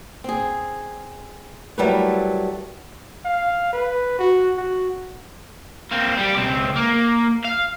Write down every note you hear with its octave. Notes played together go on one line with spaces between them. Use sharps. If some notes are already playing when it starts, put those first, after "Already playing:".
C4 G#4
F#3 G3 A3 E4 A#4 B4
F5
B4
F#4
F#4
A#3 C4
G3 G4
C#2 C4
A#3
F5